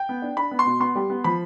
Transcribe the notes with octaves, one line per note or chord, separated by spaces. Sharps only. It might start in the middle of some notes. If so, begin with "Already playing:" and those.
Already playing: G5
B3
D4
D4 B5
B3
C6
B2
B3 C6
G3
B3
F3 B5